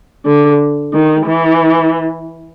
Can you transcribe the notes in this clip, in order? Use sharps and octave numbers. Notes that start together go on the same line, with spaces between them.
D3
D#3
E3